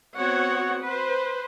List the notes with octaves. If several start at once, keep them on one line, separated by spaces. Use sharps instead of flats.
B3 C4 F#4 C#5 F#5
B4 C5